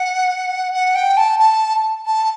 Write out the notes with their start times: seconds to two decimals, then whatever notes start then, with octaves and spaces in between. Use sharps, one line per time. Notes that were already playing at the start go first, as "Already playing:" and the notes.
Already playing: F#5
0.73 F#5
0.95 G5
1.17 A5
1.39 A5
2.06 A5